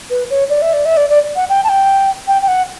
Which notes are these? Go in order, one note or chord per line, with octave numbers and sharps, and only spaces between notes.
B4
C#5
D5
E5
D5
E5
D5
D5
F#5
G5
A5
G5
G5
G5
F#5